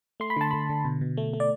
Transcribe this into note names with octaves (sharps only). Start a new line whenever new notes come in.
A3 C6
B5
D3 A5
D3 B5
D3
B2
B2
A3
A3
D5